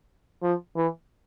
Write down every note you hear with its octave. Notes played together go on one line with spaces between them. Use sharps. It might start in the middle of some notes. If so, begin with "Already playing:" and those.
F3
E3